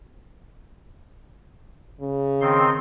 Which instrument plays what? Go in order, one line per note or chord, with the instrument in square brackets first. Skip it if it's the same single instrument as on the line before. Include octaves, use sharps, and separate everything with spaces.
[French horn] C#3
[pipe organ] D#3 C4 C6